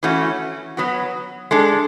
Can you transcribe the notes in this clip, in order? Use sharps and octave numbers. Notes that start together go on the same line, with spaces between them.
E3 A3 C#4 F#4
F#3 B3 F#4
G#3 D4 A4